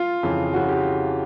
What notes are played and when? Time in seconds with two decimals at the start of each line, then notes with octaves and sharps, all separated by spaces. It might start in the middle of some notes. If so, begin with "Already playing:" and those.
Already playing: F4
0.23 F2 C#3 E3
0.53 F2 C#3 E3 F#4
0.69 G4